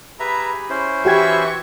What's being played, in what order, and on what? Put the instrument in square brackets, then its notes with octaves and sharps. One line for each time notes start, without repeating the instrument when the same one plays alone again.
[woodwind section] G4 G#4 B5 [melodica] B4 E5 A#5
[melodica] C#4 E4 C5
[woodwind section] E3 [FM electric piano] F#4 G4 G#6 [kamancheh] E5 C#6